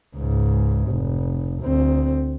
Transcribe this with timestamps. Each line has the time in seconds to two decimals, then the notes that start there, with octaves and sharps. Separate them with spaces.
0.16 C#2 G#2
0.90 F1
1.62 D2 C4